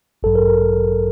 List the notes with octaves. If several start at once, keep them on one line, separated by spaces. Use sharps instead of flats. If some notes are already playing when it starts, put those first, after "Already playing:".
A1 G2 F#3 A4
A#4
A#4